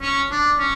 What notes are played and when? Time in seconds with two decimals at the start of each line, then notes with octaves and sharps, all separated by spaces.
0.02 C#4
0.31 D4
0.59 C#4